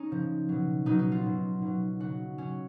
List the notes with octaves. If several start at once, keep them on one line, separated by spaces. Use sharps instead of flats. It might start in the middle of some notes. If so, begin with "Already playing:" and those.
Already playing: C#4 D#4
C#3 F3
B2 F#3
B2 F#3 D#4
D#4
F4
B2 F#3
B2 F#3
C#3 F#3 F#4
C#3 F#3 C#4